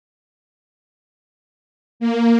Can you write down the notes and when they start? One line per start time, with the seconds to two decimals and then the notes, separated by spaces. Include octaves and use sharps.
2.00 A#3